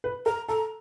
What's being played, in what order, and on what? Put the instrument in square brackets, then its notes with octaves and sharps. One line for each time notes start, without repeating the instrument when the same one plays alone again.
[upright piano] B4
[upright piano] A#4 [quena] A#5
[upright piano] A4 [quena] A#5